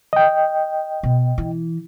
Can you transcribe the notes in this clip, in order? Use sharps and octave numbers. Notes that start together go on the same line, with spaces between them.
D#5 G5
B2
E3